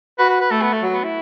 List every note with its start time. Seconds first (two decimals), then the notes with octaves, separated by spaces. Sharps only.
0.18 F#4 B4
0.29 B4
0.40 B4
0.50 A3 A4
0.61 B3
0.72 A3
0.82 F#3
0.93 B3
1.04 E4